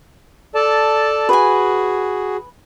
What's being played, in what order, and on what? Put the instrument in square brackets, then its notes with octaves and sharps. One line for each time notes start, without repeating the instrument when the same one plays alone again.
[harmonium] A4 D5 A5
[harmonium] F#4 G#4 [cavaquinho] B4 G#5